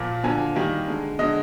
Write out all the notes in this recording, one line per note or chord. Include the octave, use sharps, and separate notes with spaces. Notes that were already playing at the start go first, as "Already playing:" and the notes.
Already playing: A#2 F3 A#3
D3 F3 A#3 G#5
D#3 G3 A#3
D3 G#3
D3 G#3 D#5